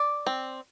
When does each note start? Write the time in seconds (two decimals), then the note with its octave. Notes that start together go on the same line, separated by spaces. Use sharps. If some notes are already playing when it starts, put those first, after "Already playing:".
Already playing: D5
0.27 C4